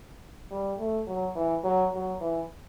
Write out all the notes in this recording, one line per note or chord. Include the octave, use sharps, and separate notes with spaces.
G3
A3
F#3
E3
F#3
F#3
E3